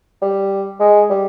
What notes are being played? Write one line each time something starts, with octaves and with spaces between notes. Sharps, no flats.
G3
G#3
G3